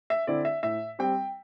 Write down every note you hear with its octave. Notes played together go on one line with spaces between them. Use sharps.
E5
D3 C4 E4 D5
E5
A2 E5
G3 C4 G5